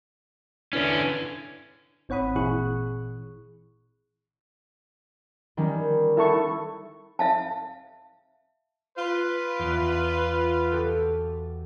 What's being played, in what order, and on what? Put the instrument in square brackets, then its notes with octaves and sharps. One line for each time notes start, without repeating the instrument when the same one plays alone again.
[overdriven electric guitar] D3 C#4 [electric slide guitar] D4 E4 B4
[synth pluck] G#1 C4 C#5 F#5 B5 D#6
A#2 E3 E4 G#4 C#6 F#6
[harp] D#3 G3 C#4
[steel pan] E4 A4 C#6
[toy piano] E5 F5 A5
[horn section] F4 B4
[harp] E2 D7
F#4 G4 A4